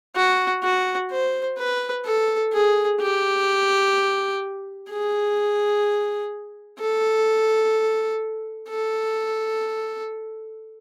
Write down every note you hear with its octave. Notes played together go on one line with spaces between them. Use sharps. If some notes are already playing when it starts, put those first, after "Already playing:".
F#4
F#4
C5
B4
A4
G#4
G4
G#4
A4
A4